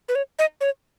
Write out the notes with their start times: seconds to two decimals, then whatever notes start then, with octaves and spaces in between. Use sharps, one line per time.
0.09 B4
0.15 C#5
0.39 D#5
0.61 C#5